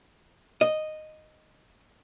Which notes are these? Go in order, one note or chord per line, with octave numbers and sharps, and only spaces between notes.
D#5